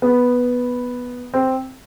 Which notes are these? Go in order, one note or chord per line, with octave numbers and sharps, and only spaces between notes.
B3
C4